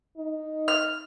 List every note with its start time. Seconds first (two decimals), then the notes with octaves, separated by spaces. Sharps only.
0.17 D#4
0.68 F6